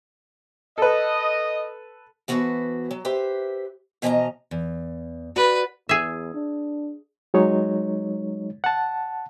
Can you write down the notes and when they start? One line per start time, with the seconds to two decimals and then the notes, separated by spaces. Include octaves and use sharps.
0.78 A4 B4 D#5
2.28 E3 B3 F#4 A4 B4 C5
2.91 F#3
3.05 G4 B4 C5 E5
4.02 B2 E3 F3 A4 D#5 A#5
4.51 E2
5.36 F#4 B4 D5
5.89 E2 G#4 E5
6.34 D4
7.34 F#3 G#3 D#4 C#5
8.64 F#5 A5